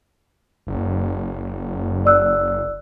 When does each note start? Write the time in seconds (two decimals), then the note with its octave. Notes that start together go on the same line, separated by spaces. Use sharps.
0.67 F#1
2.05 D5 E6 F#6